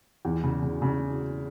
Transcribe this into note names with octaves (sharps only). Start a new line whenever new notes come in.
E2
C#3
C#3
C#3